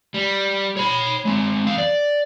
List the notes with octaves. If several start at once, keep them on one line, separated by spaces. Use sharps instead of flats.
G3
C#5 B5
G#3 C4
E2 F5
D5